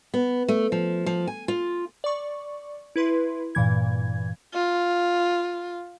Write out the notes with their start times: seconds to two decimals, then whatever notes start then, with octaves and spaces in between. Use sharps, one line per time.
0.14 B3
0.48 A3
0.72 F3
1.06 F3
1.27 G#5
1.48 F4
2.04 D5 C#6
2.96 E4 B4 C6
3.55 G2 A#2 E3 G#6
4.54 F4